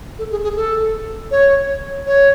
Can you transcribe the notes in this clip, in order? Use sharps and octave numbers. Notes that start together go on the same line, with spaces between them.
A4
G#4
G#4
A4
C#5
C#5